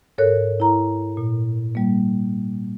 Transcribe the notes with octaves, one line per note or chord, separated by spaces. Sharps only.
G#2 A4 A#4 C#5 F#6
E4 A#5
A#2
G3 A#3